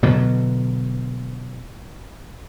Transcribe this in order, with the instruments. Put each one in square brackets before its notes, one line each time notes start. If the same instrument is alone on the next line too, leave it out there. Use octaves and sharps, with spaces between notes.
[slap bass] B2 D3 F#3